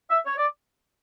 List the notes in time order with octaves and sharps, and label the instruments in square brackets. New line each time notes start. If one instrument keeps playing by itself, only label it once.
[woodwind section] E5
C#5
D5